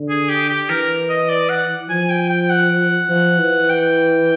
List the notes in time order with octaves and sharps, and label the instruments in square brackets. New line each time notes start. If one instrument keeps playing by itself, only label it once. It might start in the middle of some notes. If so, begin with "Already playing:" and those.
Already playing: [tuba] D3
[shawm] G#4
G4
G4
[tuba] E3 [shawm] A#4
[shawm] D#5
D5
F#5
[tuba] F3 [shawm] G#5
[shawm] G5
G5
F#5
[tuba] F3
E3
[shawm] G5